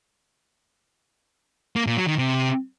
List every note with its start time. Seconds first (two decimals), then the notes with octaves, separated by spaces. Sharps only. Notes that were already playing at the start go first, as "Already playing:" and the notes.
1.76 A#3
1.87 A#2
1.97 F#3
2.08 D#3
2.18 C3